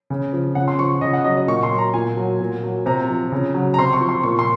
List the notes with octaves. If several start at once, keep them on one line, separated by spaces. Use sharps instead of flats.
C#3
F3
C#3 F#5
C6
F3 C#6
C#3 D#5
F#5
F#3 D#5
D#5
A#2 C#6
C6
F#3
A#5
A#2 G#5
F#3
A#2
F#3
C3 A#5
F3
C#3
F#3
A#5
C3 C6
C#6
F3
C6
A#2 C#6
C6